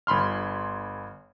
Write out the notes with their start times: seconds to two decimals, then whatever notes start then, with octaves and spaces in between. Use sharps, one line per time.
0.07 G1 B5 C6 F6